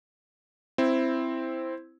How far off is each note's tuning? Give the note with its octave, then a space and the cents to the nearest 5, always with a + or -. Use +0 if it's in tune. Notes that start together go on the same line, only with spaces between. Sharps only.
C4 +0 E4 +5